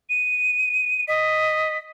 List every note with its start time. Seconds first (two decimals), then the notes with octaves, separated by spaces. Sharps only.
0.10 D#7
1.08 D#5 B6